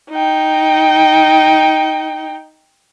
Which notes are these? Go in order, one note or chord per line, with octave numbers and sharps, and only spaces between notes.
D#4 G5